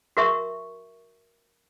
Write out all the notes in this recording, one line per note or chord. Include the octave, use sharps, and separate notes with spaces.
F#4 A#4 E5 C#6